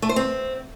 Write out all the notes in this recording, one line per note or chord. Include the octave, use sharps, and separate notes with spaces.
A3
C5
C4